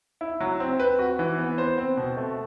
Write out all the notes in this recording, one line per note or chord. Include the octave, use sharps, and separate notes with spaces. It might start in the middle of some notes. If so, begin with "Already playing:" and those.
E4
F#3
C4
B4
F#4
E3
B3
C5
C4
B2
A3